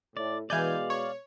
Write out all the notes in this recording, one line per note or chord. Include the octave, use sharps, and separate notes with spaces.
A2 D5
B2 E3 G#3 D5 F5 G#5 G6
C#5